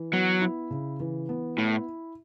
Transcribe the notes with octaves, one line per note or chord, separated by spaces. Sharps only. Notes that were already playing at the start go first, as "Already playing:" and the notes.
Already playing: E3
F#3 B3
E4
C#3
E3
B3
A2 E4